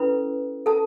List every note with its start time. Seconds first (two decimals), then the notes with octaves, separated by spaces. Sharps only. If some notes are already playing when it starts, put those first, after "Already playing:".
Already playing: C#4 E4 A4 B4 B5
0.66 A4 A5